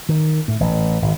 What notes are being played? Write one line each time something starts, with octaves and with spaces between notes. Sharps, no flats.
D#3
A2
A1
G#1